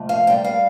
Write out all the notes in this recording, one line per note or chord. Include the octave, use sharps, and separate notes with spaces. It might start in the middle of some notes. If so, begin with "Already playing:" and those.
Already playing: F2 C3 A3
F5
G2 G3 G5
F5